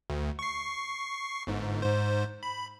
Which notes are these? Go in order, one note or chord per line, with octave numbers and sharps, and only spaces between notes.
D2
C#6 C7
G1 G#2
G#2 C5
B5